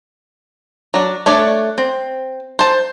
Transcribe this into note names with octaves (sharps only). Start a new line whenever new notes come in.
F#3 D4
A3 D4 C#5 D5
C4
C5 A5